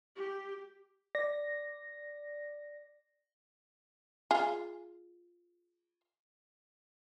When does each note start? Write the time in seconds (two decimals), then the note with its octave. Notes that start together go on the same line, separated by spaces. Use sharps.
0.17 G4
1.15 D5 A#6
4.31 F4 G#4